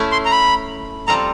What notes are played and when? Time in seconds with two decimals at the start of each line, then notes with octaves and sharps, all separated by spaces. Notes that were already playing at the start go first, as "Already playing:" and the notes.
Already playing: A3 C#4 E4
0.12 C6
0.25 A#5
0.31 B5
1.08 G3 C4 F4 A4 A#5